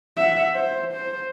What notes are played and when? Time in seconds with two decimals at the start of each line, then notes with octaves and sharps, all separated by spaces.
0.16 E5 F#5
0.55 C5
0.92 C5